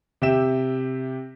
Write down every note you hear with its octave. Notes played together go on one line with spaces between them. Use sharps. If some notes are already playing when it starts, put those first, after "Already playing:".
C3 G4 E5 E7